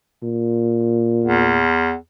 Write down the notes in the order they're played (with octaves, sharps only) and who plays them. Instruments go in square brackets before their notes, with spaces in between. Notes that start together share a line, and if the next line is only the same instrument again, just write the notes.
[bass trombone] A#2
[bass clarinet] E2